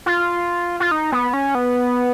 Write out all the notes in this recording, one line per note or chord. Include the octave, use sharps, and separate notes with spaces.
F4
F4
D#4
B3
C#4
B3